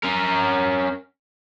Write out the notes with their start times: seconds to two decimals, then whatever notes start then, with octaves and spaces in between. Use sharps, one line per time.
0.03 C#4 A#4